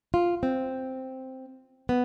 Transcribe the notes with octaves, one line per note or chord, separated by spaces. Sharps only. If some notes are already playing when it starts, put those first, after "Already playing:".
F4
C4
B3